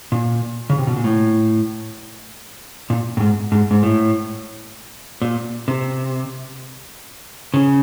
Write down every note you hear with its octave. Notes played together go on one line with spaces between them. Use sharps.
A#2
C#3
C3
B2
A#2
A2
A#2
A2
G#2
G#2
G#2
A2
A#2
C3
C#3